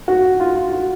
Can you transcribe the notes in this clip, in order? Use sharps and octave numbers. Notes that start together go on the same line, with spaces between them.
F#4
F4
F4
F#4